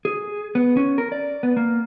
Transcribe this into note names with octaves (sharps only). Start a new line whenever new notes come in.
G#4
B3
C#4
A#4
D5
B3
A#3